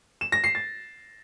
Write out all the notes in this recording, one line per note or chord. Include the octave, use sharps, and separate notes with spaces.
E7
A#6
C7
A6